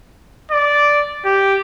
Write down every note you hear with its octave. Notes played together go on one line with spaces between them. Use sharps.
D5
G4